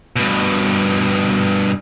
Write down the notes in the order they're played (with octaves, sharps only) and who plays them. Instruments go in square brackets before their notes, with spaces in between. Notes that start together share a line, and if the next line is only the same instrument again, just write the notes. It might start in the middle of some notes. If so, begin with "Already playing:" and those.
[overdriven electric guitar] G2 B2